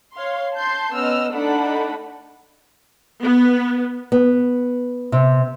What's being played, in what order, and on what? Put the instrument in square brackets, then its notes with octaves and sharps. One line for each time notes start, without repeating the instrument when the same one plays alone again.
[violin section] C#5 F5 C6
A5 C6 G6
B3 C#4 D#5 E6 F6
A3 D4 D#4 D5 F#5 B5
[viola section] B3
[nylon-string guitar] B3
C3